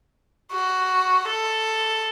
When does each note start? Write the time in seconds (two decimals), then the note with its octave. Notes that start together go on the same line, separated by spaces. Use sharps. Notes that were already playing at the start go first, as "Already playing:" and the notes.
0.52 F#4
1.27 A4